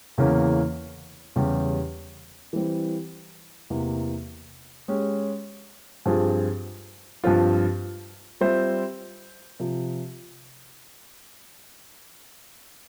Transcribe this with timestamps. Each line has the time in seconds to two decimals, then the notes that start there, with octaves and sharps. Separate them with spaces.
0.18 E2 C#3 E3 A#3 C#4
1.36 E2 C#3 G3 C#4 G4
2.53 E3 G3 C4
3.70 E2 C3 E3 A#3
4.88 G#3 C#4 G4
6.06 G2 F3 C4 F4 G#4
7.24 G2 F3 C4 F4
8.41 G3 C4 F4 C5 E5
9.60 C3 F3